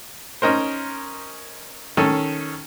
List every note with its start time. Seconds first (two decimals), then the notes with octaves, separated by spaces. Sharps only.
0.42 C#4 D#4 A#4 C5
1.97 D#3 C#4 A4 A5